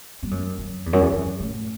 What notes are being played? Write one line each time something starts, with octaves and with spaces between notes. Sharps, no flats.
G2
F#2
F#2
E2
F#2
E2
F#2
A2